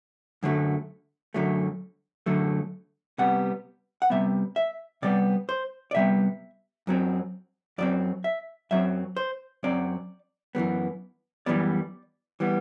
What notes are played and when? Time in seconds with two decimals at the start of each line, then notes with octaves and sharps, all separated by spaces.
0.43 F#2 D3 F#3 A3
1.34 F#2 D3 F#3 A3
2.26 F#2 D3 F#3 A3
3.18 C3 G3 B3 F#5
4.02 F#5
4.10 C3 G3 B3 E5
4.56 E5
5.02 C3 G3 B3 D5
5.49 C5
5.91 D5
5.95 C3 G3 B3 E5
6.87 F#2 F#3 C4
7.78 F#2 F#3 C4 D5
8.24 E5
8.71 F#2 F#3 C4 E5
9.17 C5
9.63 F#2 F#3 C4 D5
10.55 F#2 E3 G3 B3
11.46 F#2 E3 G3 B3 D5
12.40 E3 G3 B3